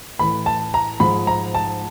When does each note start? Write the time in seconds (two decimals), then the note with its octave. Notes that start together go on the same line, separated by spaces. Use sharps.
0.19 A2 E3 B5
0.46 A5
0.74 A#5
1.00 G#2 F3 B5
1.27 A#5
1.54 A5